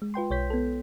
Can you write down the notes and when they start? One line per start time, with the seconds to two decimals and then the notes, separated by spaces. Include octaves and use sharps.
0.02 G#3
0.14 F4 B4 G5 C6
0.30 B1 C#5 G6 B6
0.50 B3 A4